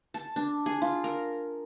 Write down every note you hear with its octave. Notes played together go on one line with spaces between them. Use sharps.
A5
D4
G#4
F4
A#4